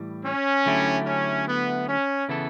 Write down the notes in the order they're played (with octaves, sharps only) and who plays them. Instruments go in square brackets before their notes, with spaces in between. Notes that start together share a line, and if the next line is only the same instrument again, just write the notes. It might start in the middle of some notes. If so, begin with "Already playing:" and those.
Already playing: [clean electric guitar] A2 E3 G3
[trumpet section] C#4
[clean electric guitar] D3 F#3 A3 E4 G4
[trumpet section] C#4
B3
C#4
[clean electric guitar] C#3 E3 B3 E4 A4